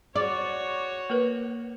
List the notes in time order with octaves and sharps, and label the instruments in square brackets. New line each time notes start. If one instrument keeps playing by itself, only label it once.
[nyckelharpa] F#4 C#5 [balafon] G#4 [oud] D5
[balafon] A#3 A#4 B4